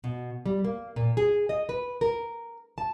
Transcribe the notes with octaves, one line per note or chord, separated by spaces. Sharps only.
B2
G3
A#3
A#2
G#4
D#5
B4
A#4
A5